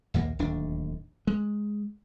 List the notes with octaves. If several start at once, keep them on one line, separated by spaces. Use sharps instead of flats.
A#1 D#2 A#3
D1 D#2 D4
G#3